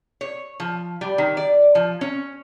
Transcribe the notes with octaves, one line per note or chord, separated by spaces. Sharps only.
C#5
F3
G3
D#3
D5
F3
C#4